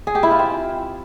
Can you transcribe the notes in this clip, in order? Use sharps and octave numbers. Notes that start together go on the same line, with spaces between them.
G#4
G4
E4
F4
C4